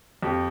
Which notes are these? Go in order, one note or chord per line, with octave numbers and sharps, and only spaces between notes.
F2 G4